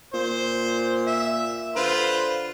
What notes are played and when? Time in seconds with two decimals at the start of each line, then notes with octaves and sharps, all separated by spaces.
0.14 A#2 C5
1.07 E5
1.76 D3 F4 B4 C5